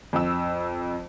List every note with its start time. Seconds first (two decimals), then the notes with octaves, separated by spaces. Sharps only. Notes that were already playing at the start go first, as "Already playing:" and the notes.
0.13 F2 E6